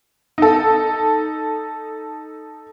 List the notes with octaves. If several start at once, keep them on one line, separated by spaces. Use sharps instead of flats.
D#4 A4